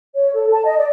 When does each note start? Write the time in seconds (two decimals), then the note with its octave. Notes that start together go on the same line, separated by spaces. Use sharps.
0.15 C#5
0.34 A4
0.51 A5
0.65 D#5
0.77 D5